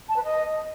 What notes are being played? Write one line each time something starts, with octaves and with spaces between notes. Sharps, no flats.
A5
B4
D#5